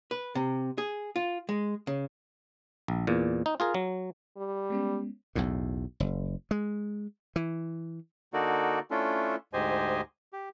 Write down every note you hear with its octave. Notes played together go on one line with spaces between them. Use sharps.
B4
C3
G#4
F4
G#3
C#3
A#1
E2 A#2
D#4
F4 G#4 A#4
F#3
G3
G#3 B3 C#4
B1 E2 A2
F#1
G#3
E3
D3 A#3 D#4 F#4 A4 D5
A3 C#4 D4 E4 F4 A4
D2 G#2 G4 C5 D#5 G#5
G4